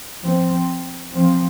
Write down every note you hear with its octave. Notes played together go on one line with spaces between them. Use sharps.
F3 C4
F3 C4